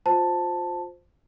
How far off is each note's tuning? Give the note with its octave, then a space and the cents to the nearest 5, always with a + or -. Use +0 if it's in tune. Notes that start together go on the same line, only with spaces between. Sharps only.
F4 +20 C5 +0 A5 +5